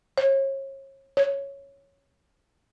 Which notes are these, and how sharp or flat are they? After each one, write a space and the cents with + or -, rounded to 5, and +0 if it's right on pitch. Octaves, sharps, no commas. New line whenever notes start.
C#5 -35
C#5 +0